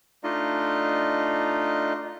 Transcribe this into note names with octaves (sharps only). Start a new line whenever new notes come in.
A3 D4 D#4 F4 D#5